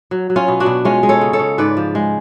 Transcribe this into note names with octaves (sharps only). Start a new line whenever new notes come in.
F#3
F#3
C#4 F4
B2
D4 F#4
B2
G#3 C#4 F4
G#3
A4 C#5
C#3
A4 C#5
C#3
G#2 B4 D5
F3
G#3